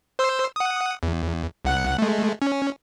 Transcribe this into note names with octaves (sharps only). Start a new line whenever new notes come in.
C5 C6 E6
F#5 D#6
E2
C2 F#5 F#6
G#3 A3
C#4